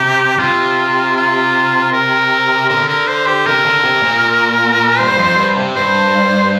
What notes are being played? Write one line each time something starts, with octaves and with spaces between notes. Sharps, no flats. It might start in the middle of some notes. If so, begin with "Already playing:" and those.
Already playing: C3 G4
C3 F4
F4
A#4
D3 A#4
A#4
C5
G4
C3 A#4
D3
C3
A#2
G2 C5
F2
G2
C3
G2 C5